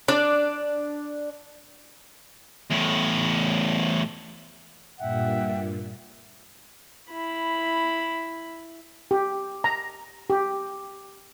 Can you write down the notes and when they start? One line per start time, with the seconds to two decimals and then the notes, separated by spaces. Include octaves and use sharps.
0.08 D4 D5
2.70 E2 A2
4.99 G2 A#2 E5 F#5 G5
7.11 E4 B5
9.11 G4
9.64 A#5
10.30 G4